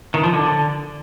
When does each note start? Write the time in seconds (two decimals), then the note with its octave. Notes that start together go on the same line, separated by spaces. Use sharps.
0.14 D#3
0.24 F3
0.33 D3